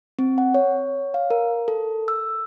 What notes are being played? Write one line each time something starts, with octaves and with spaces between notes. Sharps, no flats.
C4
F#5
C#5
F5
A#4
A4
E6